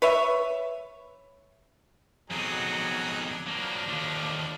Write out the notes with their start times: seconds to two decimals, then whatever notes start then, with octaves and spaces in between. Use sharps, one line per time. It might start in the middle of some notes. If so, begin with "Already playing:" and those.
0.02 B4 C#5 E5
2.30 F2 B2 F#3 D#4 G#4
3.28 D4
3.46 F3 F#3 A#3 D4
3.88 D#2 D3